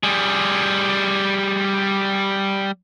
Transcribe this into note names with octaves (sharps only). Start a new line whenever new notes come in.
G3 G#4